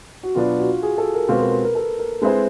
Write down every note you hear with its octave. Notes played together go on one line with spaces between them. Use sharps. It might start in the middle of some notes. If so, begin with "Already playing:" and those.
F#4
B2 F#3 B3 D4 F4
F#4
G#4
A4
A#4
B2 G#3 C4 F4 B4
A#4
A#4
A#4
A4
A#4
G#3 C4 E4 G#4 B4 C5